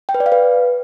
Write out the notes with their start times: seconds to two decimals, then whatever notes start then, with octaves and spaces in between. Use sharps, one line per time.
0.09 G5
0.14 B4
0.20 D5
0.26 F5
0.32 B4